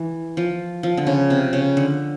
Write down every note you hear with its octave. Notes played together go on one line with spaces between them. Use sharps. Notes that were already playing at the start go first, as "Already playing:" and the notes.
Already playing: E3
F3
F3
D3
C#3
C3
C#3
D3